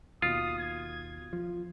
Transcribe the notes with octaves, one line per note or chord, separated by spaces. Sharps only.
D#2 B2 F4 D#6
G#6
F3